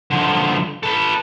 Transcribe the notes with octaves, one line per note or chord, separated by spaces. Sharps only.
D3 F3
A4 B4